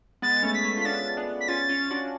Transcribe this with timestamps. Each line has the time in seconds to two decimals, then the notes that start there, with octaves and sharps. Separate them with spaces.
0.22 G#3 B3 A6
0.36 B3
0.43 A3 C#4 A6
0.54 B6
0.64 A3 C#4
0.77 F4
0.81 B6
0.85 B3 D4 A6
1.17 B3 D4
1.41 B6
1.48 C#4 F4 A6
1.69 C#4 F4
1.91 D4 F#4